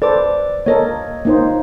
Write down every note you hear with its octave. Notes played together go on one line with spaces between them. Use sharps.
A4 B4 C5 D5 D6
A#3 A4 A#4 C#5 D#5
A#3 D#4 C5